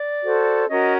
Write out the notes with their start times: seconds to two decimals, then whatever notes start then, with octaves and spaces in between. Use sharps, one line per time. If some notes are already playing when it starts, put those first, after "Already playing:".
Already playing: D5
0.22 F#4 A4 C5
0.69 C#4 F#4 A#4 D#5